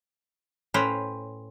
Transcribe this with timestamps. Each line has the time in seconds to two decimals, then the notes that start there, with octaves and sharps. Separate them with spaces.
0.74 A2 C#4 B4 C5 G5 A#5